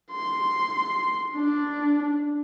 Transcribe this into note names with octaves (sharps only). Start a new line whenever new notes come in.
C6
D4